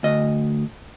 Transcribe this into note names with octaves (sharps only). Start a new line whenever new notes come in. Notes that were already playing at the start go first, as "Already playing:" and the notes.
D2 D#5